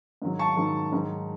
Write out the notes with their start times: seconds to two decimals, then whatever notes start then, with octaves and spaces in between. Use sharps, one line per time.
0.22 G#2 D#3 F#3
0.39 A5 C#6
0.56 G#2 D#3 F#3
0.92 G#2 D#3 F#3